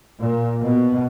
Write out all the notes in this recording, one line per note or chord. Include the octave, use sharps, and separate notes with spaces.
A#2
B2